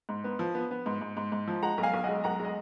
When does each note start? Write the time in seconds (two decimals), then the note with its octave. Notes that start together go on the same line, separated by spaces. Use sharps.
0.09 G#2
0.24 B3
0.39 F3
0.55 B3
0.71 B3
0.86 G#2
1.01 G#2
1.17 G#2
1.32 G#2
1.47 F3
1.63 G#3 F#5 A#5
1.78 B1
1.83 F5 G#5
1.94 B1
2.04 D#5 F#5
2.09 G#3
2.24 B1 F#5 A#5
2.40 G#3 D#5